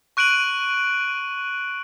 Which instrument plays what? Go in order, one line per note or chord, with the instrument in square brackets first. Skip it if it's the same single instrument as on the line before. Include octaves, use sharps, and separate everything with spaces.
[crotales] C#6 F#6 D7 D#7 F#7